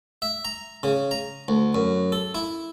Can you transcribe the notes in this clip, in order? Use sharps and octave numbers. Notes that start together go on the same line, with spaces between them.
E5
A#5
C#3
A#5
D2
F#2
A4
E4